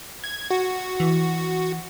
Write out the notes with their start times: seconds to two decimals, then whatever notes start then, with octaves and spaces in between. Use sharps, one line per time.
0.24 G#6
0.51 F#4
1.00 E3